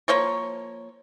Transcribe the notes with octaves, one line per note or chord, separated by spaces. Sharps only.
F3 A#3 C5 C#5